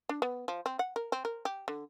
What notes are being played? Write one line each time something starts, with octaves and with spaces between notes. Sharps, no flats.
D4
B3
F3
C4
F#5
A#4
C4
A#4
G4
D3